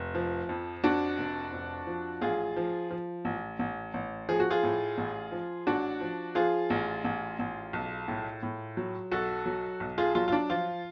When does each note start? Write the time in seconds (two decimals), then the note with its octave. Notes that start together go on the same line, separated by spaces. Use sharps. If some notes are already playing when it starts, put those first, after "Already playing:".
Already playing: F1
0.15 F3
0.49 F2
0.84 F2 D4 F#4
1.18 F1
1.53 F2
1.87 F3
2.21 A1 F4 G#4
2.56 F3
2.90 F3
3.25 A1
3.59 A1
3.94 A1
4.29 F3 G#4
4.40 F#4
4.50 F4 G#4
4.63 A2
4.98 A1
5.32 F3
5.67 A1 D4 F#4
6.01 F3
6.35 F3 F4 G#4
6.70 A1
7.04 A1
7.39 A1
7.73 B1
8.08 A2
8.43 A2
8.77 F#3
9.11 B1 F#4 A4
9.46 F#3
9.80 B1
9.98 F4 G#4
10.15 F#3 F4
10.28 F4
10.32 D4
10.50 F3 F4